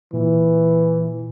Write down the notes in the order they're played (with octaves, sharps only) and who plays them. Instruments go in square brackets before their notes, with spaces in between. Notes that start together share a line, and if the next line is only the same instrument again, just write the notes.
[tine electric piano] A#2 [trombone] E3